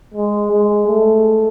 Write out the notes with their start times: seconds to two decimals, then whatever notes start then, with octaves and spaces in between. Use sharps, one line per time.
0.14 G#3
0.51 G#3
0.88 A3